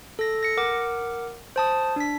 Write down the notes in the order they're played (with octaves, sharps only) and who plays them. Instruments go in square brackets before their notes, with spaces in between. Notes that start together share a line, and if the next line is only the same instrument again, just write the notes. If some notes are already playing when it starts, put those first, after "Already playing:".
[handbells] A4 A#6
A#6 C#7
A#4 F#5 D6
C5 A5 D#6
D4 B6